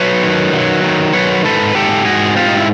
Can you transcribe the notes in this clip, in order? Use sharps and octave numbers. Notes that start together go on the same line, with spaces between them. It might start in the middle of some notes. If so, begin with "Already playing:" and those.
Already playing: F#3 B4 C#5
D#3
F#3
D#3
F#3 B4 C#5
G#2 A4 B4
G#2 G4 A4
G#2 F#4 G#4
C4 F4 G4
D#4
E4